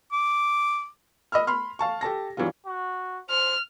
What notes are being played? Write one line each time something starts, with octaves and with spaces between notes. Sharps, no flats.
D6
D#5 B5 E6 F6
B5 C6 F6
F5 A5 C#6
G4 A4 A5 A#6
G2 E3 F#3 G3 F4
F#4
C5 F6